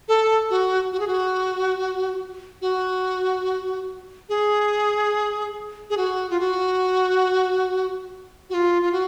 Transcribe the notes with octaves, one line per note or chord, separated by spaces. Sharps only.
A4
F#4
F#4
G#4
F#4
F#4
G#4
G#4
F#4
F4
F#4
F#4
F4
F4
F#4